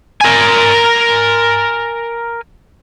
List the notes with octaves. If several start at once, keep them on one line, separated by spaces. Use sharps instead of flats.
A#4 G#5